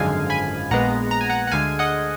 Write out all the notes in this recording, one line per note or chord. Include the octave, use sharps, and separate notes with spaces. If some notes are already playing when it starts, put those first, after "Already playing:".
Already playing: G#1 F#2 D3 F3 G#3 F5 G#5
G#5 B5
A#1 A#2 G#3 B3 F#5 A#5
A#5
G#5
F#5 A#5
F#5
D2 D3 G#3 F5 G#5
D#5 F#5